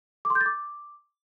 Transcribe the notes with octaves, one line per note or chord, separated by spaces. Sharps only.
D6
C6
G6
A6
D6